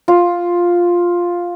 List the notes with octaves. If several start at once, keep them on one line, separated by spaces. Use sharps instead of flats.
F4